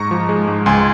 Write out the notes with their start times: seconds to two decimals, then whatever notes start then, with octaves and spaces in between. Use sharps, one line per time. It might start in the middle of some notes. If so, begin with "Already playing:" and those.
Already playing: G#2 A#5 C#6
0.11 F3
0.29 G#3
0.48 G#2
0.66 C#2 G#5 C6